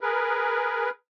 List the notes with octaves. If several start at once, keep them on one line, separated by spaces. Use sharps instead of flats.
G#4 A#4 B4